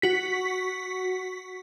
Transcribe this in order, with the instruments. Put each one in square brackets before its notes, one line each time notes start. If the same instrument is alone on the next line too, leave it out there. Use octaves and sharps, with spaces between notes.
[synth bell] F#4 B6